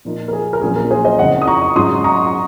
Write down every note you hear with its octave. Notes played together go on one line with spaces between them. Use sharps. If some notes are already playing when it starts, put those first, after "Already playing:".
A#2 F3 A#3 D#4
A#4
G#4
A#4
A#1 A#2 F#3 C#4 F4 G#4
A#4
G#4 C5
C5 D#5
F#1 F2 C#3 D#5 F#5
D#6
A#5 C#6
G#2 F#3 C#4 C6 D#6
A#5 C#6
C#6